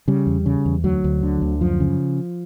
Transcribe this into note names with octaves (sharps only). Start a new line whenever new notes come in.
C#3 G3
E2
C#3
E2
D2 F#3
D2
D3
D2
F#2 F3
C#3